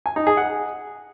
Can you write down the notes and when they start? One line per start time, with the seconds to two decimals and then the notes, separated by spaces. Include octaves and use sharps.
0.06 G#5
0.16 D#4
0.27 G#4
0.37 F#5